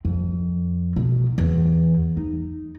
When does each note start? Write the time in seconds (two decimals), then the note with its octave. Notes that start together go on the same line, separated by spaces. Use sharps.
0.05 F2
0.96 B2
1.38 E2
2.17 D#4